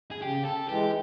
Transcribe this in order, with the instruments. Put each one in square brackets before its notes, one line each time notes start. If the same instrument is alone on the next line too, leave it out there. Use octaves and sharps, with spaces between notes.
[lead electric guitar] G#4
[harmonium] C#3 [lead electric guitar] G4
[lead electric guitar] A4
[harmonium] E3 G#3 [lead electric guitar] G4